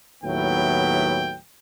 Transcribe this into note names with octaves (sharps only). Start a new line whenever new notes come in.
D#2 A2 F#3 B3 E4 G5